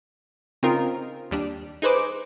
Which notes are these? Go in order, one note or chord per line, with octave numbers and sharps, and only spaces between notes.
C#3 C4 D#4 F4 A#4
D#2 G3 D4
D#4 G#4 B4 C5 D6